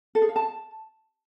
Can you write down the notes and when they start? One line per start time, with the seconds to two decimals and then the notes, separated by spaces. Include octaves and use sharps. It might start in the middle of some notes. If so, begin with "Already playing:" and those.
0.15 A4
0.22 G#4
0.29 F5
0.36 A5